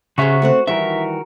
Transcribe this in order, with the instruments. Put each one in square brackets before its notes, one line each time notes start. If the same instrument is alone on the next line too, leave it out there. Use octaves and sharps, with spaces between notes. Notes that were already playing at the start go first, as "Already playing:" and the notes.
[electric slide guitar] C#3 E5 [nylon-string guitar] C#4 G#4 C5 [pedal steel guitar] F#4 C#6 F#6
[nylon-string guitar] A3 C4 F#5
[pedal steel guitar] D#3 F#4 A#4 [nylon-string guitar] E3 G3 [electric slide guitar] E5